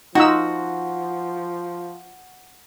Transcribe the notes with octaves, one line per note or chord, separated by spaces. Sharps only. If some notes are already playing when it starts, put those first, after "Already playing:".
F3 D#4 F4 F#4 E6